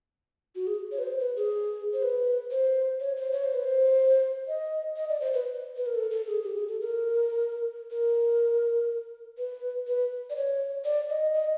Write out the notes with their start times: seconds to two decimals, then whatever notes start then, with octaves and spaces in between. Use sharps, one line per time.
0.55 F#4
0.67 G#4
0.92 C#5
0.99 B4
1.03 C5
1.20 B4
1.36 G#4
1.93 C5
2.03 B4
2.51 C5
3.00 C#5
3.16 C5
3.33 C#5
3.44 C5
3.54 B4
3.64 C5
4.48 D#5
4.96 D#5
5.09 D5
5.21 C5
5.34 B4
5.76 B4
5.86 A#4
5.95 A4
6.11 A4
6.27 G#4
6.44 G4
6.56 G#4
6.68 A4
6.81 A#4
7.91 A#4
9.38 B4
9.87 B4
10.30 D5
10.36 C#5
10.85 D5
11.10 D#5
11.34 D#5